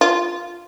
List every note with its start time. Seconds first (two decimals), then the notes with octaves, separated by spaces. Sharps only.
0.01 F4